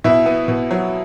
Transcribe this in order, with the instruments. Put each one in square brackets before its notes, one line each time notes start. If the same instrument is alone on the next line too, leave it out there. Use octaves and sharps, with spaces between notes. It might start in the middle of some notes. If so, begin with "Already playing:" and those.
[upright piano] B2 [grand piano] E4 E5
[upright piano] B3
B2
F#3